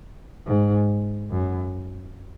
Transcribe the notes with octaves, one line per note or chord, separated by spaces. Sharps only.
G#2
F#2